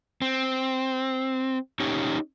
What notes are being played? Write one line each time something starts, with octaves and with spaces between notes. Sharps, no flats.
C4
C#4 D#4 G4 C#5